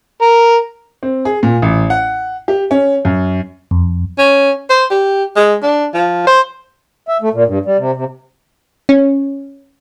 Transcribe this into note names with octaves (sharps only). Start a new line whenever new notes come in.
A#4
C4
G#4
A#2
A1
F#5
G4
C#4
F#2
F2
C#4
C5
G4
G#3
D4
F3
C5
E5
A3
A#2
G2
G3
C3
C3
C#4